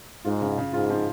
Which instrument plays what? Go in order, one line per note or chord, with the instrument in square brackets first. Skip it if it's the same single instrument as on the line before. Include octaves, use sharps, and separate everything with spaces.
[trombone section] G#2 [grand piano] F4
[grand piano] C#3
C#3
[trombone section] G#2 [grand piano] F4
[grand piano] F3